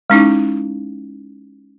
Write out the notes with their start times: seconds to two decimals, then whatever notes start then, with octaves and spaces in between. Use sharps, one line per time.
0.10 G#3 C#4 D#4 E4